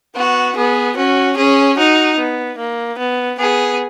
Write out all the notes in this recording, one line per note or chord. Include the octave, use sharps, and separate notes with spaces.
B3 F#4
B3 G#4
C#4 F#4
C#4 G#4
D#4 F#4
B3
A#3
B3
B3 G#4